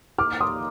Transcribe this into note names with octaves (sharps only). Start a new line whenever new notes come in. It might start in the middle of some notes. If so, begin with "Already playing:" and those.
D#2 D#3 A#3 D#4 D6 F6
C6 D#6